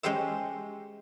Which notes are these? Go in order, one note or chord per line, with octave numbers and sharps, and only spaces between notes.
G#3 C#4 G4 C5 E5